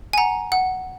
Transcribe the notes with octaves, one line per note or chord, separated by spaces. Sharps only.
G#5
F#5 A#5
F#5